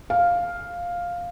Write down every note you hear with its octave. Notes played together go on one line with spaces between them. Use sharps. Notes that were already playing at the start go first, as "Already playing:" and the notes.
F5